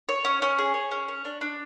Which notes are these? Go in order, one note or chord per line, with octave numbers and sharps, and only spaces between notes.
C#5
C#4
C#4
G#4
C#5
C#4
C#5
D4
D4